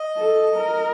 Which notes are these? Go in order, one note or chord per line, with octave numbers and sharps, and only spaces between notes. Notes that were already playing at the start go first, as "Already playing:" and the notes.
Already playing: D#5
A4
A#4